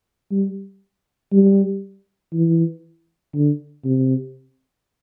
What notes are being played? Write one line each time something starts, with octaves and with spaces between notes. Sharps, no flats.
G3
G3
E3
D3
C3